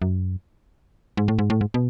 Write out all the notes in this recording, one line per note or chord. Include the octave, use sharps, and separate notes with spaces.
F#2
G#2
A2
G#2
A2
G#2
B2